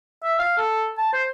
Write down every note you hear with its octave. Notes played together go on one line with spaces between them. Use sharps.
E5
F5
A4
A5
C5